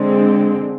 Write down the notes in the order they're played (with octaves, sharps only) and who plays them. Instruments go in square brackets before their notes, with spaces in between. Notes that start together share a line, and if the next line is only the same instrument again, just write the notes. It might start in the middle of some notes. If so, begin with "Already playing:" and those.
Already playing: [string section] D3 G#3 C4